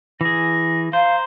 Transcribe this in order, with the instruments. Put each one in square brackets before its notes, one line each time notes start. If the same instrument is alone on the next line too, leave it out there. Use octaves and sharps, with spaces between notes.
[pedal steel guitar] E3 G#4 [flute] A#6
[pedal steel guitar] C5 [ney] F5 [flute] A#5